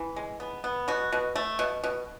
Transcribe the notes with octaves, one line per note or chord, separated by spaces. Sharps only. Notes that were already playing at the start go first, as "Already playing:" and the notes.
Already playing: E3
G#3
B3
B3
B2 F#4
B2
A3
B2
B2